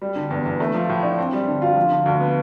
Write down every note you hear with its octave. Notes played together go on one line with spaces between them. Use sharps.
G3
D3
E2
E2
A3
F3
A2
D4
C4
G3
D3
F4
F3
D3
D2
B3